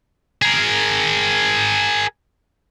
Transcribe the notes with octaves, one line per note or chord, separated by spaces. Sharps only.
G#4 A#4